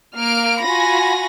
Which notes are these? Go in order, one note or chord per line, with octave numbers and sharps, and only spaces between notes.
A#3 F6 D7
F4 F#4 G#5 B5 A#6